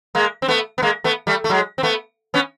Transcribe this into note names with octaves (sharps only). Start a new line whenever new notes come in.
G#3 A#3
C4
A3 B3
B3
G#3 A#3
A3 B3
G3 A3
A3
F#3 G#3
C4
A3 B3
B3 C#4